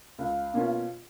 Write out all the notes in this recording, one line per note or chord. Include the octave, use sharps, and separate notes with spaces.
C#2 F5
B2 A#3 C#4 F4